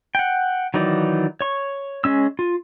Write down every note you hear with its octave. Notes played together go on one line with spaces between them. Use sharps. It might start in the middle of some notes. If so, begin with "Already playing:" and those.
F#5 G5
D#3 E3 F#3 D#4 D5
C#5 C#6
G#3 C#4 E6
F4